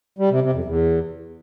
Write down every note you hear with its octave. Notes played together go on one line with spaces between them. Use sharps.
G3
C3
C3
F2
E2